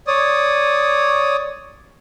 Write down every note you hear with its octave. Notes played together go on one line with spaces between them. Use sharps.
C#5 D5 D#6